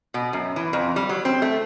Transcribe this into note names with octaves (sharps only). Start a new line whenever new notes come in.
B2
F#2
E3
F2
G3
F#3
C4
A3